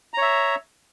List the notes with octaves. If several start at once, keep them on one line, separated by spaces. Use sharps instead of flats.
C#5 E5 A#5